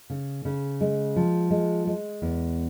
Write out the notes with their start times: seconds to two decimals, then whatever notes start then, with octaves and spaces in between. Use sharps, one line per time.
0.10 C#3
0.45 C#3
0.81 G#3
1.16 F3
1.51 G#3
1.87 G#3
2.22 E2